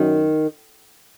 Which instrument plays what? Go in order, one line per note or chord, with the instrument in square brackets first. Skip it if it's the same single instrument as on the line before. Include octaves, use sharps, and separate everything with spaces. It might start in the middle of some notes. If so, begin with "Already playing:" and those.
Already playing: [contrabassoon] F#2 [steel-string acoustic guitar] D#3